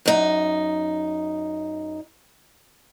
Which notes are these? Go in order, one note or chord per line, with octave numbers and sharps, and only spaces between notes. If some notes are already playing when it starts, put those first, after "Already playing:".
F#2 D#4